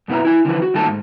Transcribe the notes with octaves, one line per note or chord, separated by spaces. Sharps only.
F#2 B2 E4 B4 A#5
E4 G#5
D3 E3 F3 B4
F#4
G2 D#3 A3 A#3 A4 A5
G#2